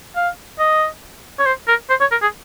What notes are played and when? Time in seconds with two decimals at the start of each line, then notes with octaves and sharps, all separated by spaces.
0.16 F5
0.59 D#5
1.39 C#5
1.46 C5
1.68 A#4
1.90 C5
2.01 C#5
2.12 A#4
2.22 G#4